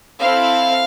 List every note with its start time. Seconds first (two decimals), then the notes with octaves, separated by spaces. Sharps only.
0.20 C4 E4 A4 F5